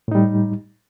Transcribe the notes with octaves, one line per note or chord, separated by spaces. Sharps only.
A2 G3 D#4